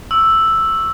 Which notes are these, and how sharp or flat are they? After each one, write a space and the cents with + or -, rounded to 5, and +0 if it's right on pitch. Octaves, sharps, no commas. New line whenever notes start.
C#6 +0 E6 +0